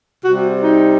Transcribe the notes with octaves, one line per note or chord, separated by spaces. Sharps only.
C3 G3 F#4
D#4